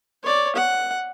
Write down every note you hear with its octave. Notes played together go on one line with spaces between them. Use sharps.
C#5 D5
F#5